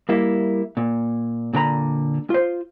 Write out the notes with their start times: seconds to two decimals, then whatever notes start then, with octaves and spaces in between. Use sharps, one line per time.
0.09 G3 A#3 E4
0.77 A#2
1.53 A#2 D3 B4 A#5 B5
2.30 F4 C5